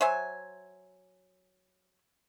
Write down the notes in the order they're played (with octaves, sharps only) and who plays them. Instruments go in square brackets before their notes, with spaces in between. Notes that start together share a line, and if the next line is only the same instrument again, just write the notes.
[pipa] F#3 C5 E5 G#5